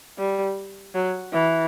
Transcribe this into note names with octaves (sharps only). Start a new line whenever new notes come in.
G3
F#3
E3